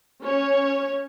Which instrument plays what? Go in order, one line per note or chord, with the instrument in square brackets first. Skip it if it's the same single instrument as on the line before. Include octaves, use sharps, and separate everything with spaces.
[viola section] C#4 C#5